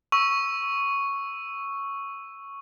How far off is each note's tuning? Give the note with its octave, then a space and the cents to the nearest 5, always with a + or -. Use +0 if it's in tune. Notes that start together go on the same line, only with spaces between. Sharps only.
C#6 +0 E6 +0